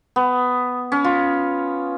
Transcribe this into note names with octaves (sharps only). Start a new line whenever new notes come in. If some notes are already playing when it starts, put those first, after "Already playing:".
B3
C#4
F4